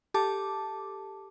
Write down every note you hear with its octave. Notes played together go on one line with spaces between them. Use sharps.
G4 A4 A5 D6